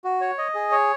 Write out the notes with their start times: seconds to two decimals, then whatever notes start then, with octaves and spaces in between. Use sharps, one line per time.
0.04 F#4
0.21 C#5
0.38 D#5
0.55 G#4
0.72 C#5